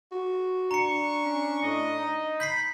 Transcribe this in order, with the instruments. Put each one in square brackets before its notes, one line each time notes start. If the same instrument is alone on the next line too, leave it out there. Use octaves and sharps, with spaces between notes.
[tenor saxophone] F#4
[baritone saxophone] D4 [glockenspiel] A#5 C#7 [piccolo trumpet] C#6
[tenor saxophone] C#4
[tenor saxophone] A2 [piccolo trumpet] D#5
[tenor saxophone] D#4
[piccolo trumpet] B5 [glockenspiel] G6 B6 C7